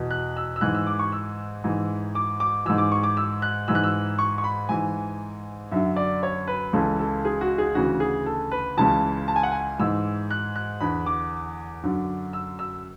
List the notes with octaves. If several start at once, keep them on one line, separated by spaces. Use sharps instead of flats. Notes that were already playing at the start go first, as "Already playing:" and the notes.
Already playing: E2 B2
F#6
E6
E6
G#2 E3 F#6
E6
D6
C#6
E6
G#2 E3
D6
D6
G#2 E3 E6
D6
C#6
D6
E6
F#6
G#2 E3 E6
F#6
E6
C#6
C#6
B5
G#2 E3 G#5
F#2 D3 E5
D5
C#5
B4
C#2 C#3 E3 A4
A4
G#4
F#4
G#4
D2 C#3 E3 F#4
G#4
A4
B4
C#2 C#3 E3 A5
A5
G#5
F#5
G#5
G#2 E3 E6
F#6
F#6
E2 D3 B5
D6
F#2 D3
E6
E6